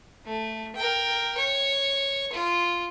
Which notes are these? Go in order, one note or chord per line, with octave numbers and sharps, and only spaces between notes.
A3
A#4 G5
C#5
F4